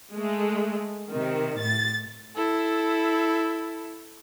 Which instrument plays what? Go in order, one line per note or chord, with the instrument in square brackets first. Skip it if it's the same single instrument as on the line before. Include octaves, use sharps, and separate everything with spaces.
[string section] G#3 A3
C3 D#3
A2 A6
[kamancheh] E4 A4